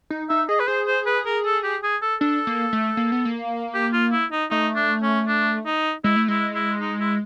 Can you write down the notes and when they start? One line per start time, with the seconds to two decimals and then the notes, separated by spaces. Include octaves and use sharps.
0.10 D#4
0.29 D#4 E5
0.49 G#4 D#5
0.60 B4
0.68 G#4 C5
0.87 C5
1.06 B4
1.26 A#4
1.45 A4
1.64 G4
1.83 G#4
2.02 A4
2.21 D4 A4
2.47 A#3
2.73 A3
2.97 A#3
3.12 B3
3.25 A#3
3.74 G4
3.93 F4
4.12 E4
4.32 D#4
4.51 A3 D#4
4.76 D4
5.02 C#4
5.28 D4
5.66 D#4
6.04 G#3 E4
6.16 A3
6.28 G#3 E4
6.55 E4
6.81 D#4
7.00 E4